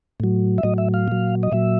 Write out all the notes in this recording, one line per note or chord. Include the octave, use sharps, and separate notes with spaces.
A2 F#3
E5
A2 F#3 D#5
E5
F5
A#2 F#3
D#5
A#2 F#3 E5